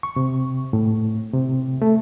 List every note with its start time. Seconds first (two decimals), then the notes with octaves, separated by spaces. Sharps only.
0.03 C#6
0.16 C3
0.73 A2
1.34 C3
1.82 A3